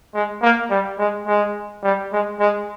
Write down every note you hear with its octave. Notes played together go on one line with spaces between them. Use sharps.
G#3
A#3
G3
G#3
G#3
G3
G#3
G#3